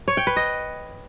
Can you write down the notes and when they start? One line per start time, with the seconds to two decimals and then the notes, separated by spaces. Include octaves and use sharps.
0.08 C#5
0.17 G5
0.27 B4
0.36 D#5